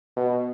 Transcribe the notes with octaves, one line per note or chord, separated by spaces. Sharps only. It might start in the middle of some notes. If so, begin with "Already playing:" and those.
B2